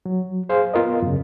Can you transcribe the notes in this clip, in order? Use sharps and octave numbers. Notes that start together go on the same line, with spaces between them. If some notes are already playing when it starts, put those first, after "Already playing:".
F#3
G#4 C5 F5
B3 F4 A#4 D#5
F#2 C#3